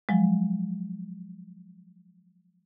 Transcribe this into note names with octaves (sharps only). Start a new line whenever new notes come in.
F3 F#3 G#3